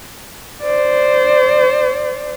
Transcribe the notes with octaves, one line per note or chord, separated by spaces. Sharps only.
C5 D5